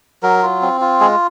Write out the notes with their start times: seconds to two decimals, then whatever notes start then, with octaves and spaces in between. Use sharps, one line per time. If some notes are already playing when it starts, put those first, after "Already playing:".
0.23 F#3 A#4
0.43 F4
0.62 C4
0.81 F4
1.00 G#3 G#4